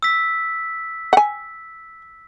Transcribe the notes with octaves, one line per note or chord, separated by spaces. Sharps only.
E6 B6
F#5 G#5